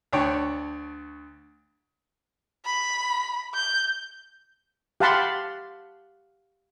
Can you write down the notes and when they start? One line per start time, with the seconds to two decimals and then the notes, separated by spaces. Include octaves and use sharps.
0.13 D2 D4 C#5 G5
2.65 B5
3.55 G6
5.00 G4 F5 F#5 A5 B5 C6